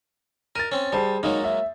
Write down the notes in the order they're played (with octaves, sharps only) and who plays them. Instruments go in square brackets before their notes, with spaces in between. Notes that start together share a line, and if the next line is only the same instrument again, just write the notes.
[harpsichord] A#4 [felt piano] A6 D#7
[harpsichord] C4 C#4
[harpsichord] G3 [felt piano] G#4 C5 A5
[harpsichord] F#3 G#3 A#3 [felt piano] D#4
[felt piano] E5